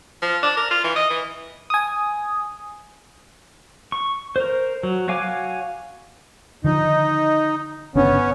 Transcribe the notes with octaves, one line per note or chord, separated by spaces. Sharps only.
F3
D4
A#4
F4
E3
D#5
E3
G#5 D#6
C#6
A#4 C5
F#3
F#4 C#5 F5 G#5 D6
D3 D#3 F3 D#4
G1 C#3 B3 C#4 D4